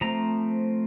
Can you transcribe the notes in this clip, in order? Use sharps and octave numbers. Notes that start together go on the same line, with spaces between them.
F3 A3 C4 A#5